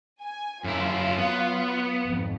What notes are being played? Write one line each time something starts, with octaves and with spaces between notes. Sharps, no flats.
G#5
F#2 F#3 E4 F4
B3
G#1 F2